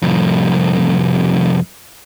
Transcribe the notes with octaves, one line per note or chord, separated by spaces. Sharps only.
C2 F2